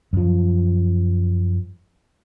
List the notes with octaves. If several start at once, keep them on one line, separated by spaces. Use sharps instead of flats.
F#2 F3